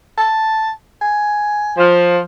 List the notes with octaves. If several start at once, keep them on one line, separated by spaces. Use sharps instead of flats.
A5
G#5
F3